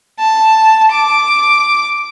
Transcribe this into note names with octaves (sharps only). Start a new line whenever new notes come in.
A5
D6